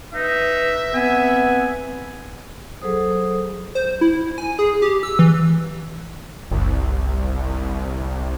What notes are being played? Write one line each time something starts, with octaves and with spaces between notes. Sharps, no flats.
D#4 B4 E5
B3 C4 G#5
F#3 G#4 A4 C5 D#6
C5
E4
G#5
G#4
G4
E6
E3
F#1 C2